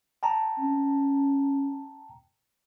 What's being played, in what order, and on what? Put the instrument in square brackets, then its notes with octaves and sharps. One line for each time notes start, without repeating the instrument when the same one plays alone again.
[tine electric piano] G5 A5 A#5
[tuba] C#4